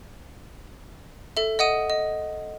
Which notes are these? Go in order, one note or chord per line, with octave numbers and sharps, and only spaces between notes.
A4 E5
D#5 F#5 D#6 D#7
D#5